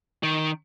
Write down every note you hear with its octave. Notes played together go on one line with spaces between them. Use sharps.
D#3